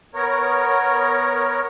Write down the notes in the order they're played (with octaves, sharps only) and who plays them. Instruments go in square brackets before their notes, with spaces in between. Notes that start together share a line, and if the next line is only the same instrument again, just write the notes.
[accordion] B3 A#4 C#5